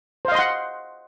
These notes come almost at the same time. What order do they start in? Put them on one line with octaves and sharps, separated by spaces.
C5 F5 D#5 C6 F#5